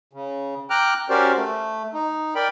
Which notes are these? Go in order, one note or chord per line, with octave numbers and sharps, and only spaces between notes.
C#3
G5 A#5 D6 F6 F#6
C#4 F#4 G4 A#4 C5 D5
A3
D#4
A#4 D5 G5 B5